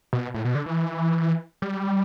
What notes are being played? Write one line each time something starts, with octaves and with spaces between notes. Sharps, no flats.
B2
A2
B2
D3
E3
G3